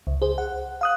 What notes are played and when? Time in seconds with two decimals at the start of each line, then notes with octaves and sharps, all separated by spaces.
0.07 C#2
0.22 G#4 C5
0.38 F#5
0.81 F5 D#6 F#6